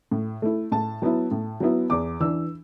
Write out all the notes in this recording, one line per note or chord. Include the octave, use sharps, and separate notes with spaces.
A2
A3 E4
A2 A5
F#3 B3 E4
A2
F#3 B3 E4
E2 D6
E3 D4 E6